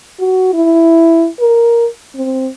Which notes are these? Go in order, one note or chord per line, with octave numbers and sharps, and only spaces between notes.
F#4
E4
A#4
C4